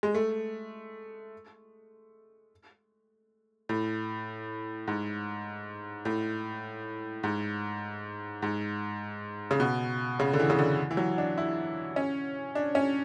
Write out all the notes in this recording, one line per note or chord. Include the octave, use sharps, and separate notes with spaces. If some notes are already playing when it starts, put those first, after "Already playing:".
G#3
A3
A2
G#2
A2
G#2
G#2
C#3
B2
C#3
D3
E3
C#3
D3
E3
F#3
D4
E4
C#4
D4
C#4